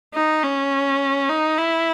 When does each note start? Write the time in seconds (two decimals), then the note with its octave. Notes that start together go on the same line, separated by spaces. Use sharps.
0.14 D#4
0.43 C#4
1.29 D#4
1.58 E4